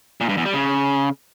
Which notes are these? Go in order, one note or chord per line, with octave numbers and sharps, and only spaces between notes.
A#2
G2
E2
G3
C#3